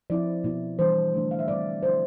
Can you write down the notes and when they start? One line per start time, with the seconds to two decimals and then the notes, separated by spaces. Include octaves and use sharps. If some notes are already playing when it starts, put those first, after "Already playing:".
0.10 F3 C4 E4 D5
0.44 B2 B3 E4
0.79 E3 G3 D4 C5
1.14 D3 A3 D4
1.31 F5
1.39 E5
1.48 B2 G3 C4 D5
1.83 D3 F3 C4 E4 C5